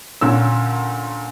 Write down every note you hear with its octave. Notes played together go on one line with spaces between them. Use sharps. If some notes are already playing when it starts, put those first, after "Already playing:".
A#2 D3 C#4 E6